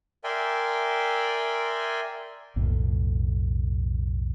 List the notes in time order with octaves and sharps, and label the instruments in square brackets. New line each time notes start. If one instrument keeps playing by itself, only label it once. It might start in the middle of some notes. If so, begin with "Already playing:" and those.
[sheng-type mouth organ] A#4 D5 E5 G5 G#5 C6
[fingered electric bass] B1 F2 A2